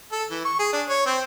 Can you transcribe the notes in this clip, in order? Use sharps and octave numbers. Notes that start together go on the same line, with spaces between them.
A4
E3
C#6
G#4
D4
C#5
C4